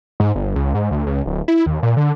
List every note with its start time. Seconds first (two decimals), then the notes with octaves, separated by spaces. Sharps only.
0.20 G#2
0.35 G1
0.56 C#2
0.74 G#2
0.91 D2
1.06 C#2
1.26 D1
1.48 E4
1.66 D#2
1.83 A#2
1.97 D3